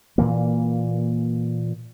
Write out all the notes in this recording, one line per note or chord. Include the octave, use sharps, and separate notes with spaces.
A#2 E3 A#3